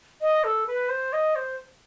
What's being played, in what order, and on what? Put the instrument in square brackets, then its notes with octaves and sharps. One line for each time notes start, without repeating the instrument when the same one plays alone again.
[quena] D#5
A4
B4
C5
D#5
C5